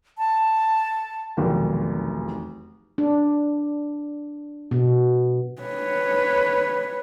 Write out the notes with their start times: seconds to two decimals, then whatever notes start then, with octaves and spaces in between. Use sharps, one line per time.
0.18 A5
1.37 F1 B1 E2 D#3
2.98 D4
4.71 B2
5.62 B4 C#5